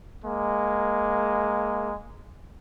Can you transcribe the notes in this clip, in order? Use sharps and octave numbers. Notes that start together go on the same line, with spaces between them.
G#3 A#3